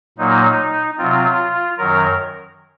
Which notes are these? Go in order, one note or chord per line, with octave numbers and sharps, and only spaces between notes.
A#2 F#3 A#3 D#4
C3 F#3 C4 F4
F#2 D#3 F#3 A#4